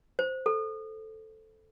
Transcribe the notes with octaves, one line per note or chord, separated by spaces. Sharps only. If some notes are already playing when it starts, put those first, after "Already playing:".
C5
A4